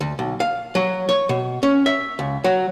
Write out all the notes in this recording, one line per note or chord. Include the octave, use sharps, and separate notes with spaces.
D2
B1
F5
F#3
C#5
B2
C#4
E5
C#2
F#3